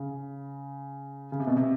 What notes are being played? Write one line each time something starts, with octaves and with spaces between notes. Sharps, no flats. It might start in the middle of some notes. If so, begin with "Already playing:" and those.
Already playing: C#3
C#3
C3
B2
C3